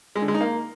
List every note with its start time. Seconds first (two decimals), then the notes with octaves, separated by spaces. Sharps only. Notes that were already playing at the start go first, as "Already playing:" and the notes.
0.16 G#3
0.22 D3
0.28 G#3
0.34 D#4
0.41 A#3